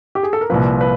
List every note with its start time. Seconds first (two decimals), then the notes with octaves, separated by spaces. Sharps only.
0.15 G4
0.23 G#4
0.33 A4
0.41 A#4
0.50 C2 A#2 F3 B4
0.81 B4